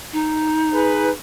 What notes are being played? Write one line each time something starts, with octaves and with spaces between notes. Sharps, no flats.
D#4
G#4 B4